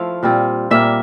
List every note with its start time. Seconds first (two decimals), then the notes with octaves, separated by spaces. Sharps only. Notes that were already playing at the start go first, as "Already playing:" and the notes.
Already playing: F3 A3 E4 F5
0.23 A#2 G3 C4 F4
0.71 A#2 G3 A#3 E5